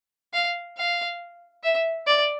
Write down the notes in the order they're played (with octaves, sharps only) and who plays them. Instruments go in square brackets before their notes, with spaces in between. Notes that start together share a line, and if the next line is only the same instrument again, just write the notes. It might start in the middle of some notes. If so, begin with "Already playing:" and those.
[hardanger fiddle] F5
F5
E5
D5